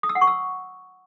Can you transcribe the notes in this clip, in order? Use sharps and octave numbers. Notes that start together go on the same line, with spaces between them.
D#6
E6
F#5
C#6
E6